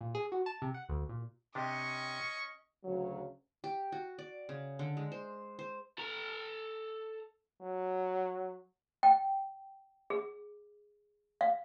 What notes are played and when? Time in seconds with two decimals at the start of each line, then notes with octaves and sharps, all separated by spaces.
0.01 A#2
0.15 G#4
0.32 F#4
0.46 A5
0.62 C3
0.74 F#5
0.89 D2
1.09 A#2
1.55 C3 C#4 D4 G4 D#5 C#6
2.84 D2 C#3 F#3
3.64 G4
3.92 F#4
4.19 D5
4.49 C#3
4.79 D3
4.97 G#3
5.12 C5
5.59 C5
5.98 A4 A#5
7.61 F#3
9.03 G5
10.10 G#4
11.41 F5